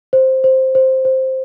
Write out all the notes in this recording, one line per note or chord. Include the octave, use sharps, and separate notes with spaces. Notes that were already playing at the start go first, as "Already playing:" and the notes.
C5
C5
C5
C5